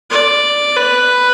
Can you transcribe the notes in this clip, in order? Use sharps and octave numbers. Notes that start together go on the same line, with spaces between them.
D5
B4